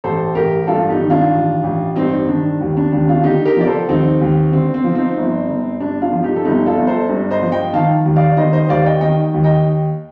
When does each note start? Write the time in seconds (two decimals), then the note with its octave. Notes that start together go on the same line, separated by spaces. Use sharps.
0.04 A1 A4 C5
0.35 A1 G4 A#4
0.67 G2 F4 A4
0.89 D#4 G4
1.00 D#3
1.10 D4 F4
1.31 A1
1.63 A1
1.95 G2 C4 D#4
2.28 D#3 D4
2.61 D#2
2.77 D4
2.92 D#2 D4
3.08 D4 F4
3.24 D3 D#4 G4
3.45 G4 A#4
3.56 F3 D5
3.67 A4 C5
3.88 D#2 C4 D#4
4.21 D#2
4.52 D3 C4
4.74 C4
4.84 F3
4.95 C4 D#4
5.17 G1
5.48 G1
5.80 G2 D4
6.02 D4 F4
6.13 F3
6.23 D#4 G4
6.36 A4
6.45 G1 D#4 G4
6.66 F4 A4
6.77 G1
6.87 A4 C5
7.09 G2
7.31 C5 D#5
7.42 F3
7.52 D#5 G5
7.73 D#3 F5 A5
8.05 D#2
8.16 D5 F5
8.37 D#3 C5 D#5
8.53 C5 D#5
8.69 D#2 D5 F5
8.86 D#5 G5
9.01 D#3 D#5 G5
9.34 D#2
9.44 D#5 G5